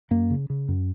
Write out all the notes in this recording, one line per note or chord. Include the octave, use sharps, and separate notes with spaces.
F#2 A#3
C#3
C#3
F#2